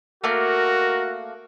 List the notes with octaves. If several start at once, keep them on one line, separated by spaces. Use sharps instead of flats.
A3 A#3 F#4 A#4